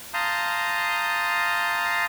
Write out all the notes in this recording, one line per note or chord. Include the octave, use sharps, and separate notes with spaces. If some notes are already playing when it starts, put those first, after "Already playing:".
F5 A5 A#5 C6 D#6 G6